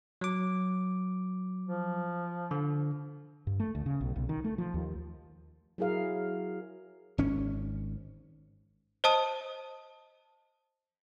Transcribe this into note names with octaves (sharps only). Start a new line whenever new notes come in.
F#3 D6
F3
D3
G2
A3
D2
C#3
B1
B1
D#3
A3
F3
D#2
F#3 E4 G#4 A#4 F5
G#1 C#4
C5 D#5 A5 D#6 D#7